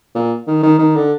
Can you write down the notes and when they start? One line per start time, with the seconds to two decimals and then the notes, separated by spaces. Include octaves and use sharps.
0.15 A#2
0.47 D#3
0.63 D#3
0.79 D#3
0.95 D3